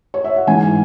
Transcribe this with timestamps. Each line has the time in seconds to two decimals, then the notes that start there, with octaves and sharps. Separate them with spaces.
0.14 C#5
0.24 E5
0.36 F#5
0.47 G#2 E3 G#5